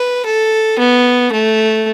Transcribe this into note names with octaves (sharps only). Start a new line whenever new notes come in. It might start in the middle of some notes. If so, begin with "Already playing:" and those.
Already playing: B4
A4
B3
A3